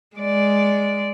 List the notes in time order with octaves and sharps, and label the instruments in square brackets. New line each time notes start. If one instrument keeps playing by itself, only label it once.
[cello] G#3 D5